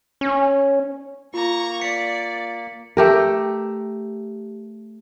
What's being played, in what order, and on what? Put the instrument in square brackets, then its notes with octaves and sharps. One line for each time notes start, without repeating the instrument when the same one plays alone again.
[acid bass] C#4
[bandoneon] A#3 [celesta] F4 [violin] A#5 C#6
[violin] D5 [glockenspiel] B6 C#7
[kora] A3 G4 A#4